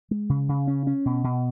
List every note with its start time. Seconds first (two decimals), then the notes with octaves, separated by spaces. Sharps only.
0.11 G#3
0.29 C#3
0.49 C#3
0.67 C#4
0.87 C#4
1.06 B2
1.24 B2